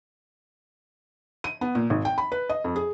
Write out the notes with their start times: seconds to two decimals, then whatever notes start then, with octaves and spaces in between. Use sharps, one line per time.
1.44 D#7
1.61 B3
1.75 A#2
1.90 G#1
2.05 G5
2.18 B5
2.32 B4
2.49 D#5
2.64 F2
2.76 G#4